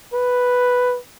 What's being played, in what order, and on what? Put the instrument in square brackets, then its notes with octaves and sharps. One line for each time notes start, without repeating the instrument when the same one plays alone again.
[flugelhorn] B4